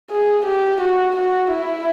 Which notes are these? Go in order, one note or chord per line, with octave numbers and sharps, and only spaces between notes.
G#4
G4
F#4
F#4
E4